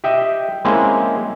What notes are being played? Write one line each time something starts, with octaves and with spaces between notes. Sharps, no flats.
G4 D#5 E5 G5
G#3 A#3 C4 C#4 E4